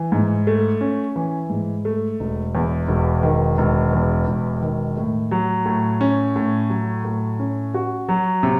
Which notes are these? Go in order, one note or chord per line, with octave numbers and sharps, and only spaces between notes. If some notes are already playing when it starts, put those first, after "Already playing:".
Already playing: E3
G#2
A3
C#4
E3
G#2
A3
E1
E2
E1
D#3
E1
E2
E1
D#3
A2
F#3
A2
C#4
A2
F#3
A2
C#4
F#4
F#3
C3